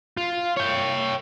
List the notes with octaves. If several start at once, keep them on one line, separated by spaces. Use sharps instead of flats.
F4
C#5 G5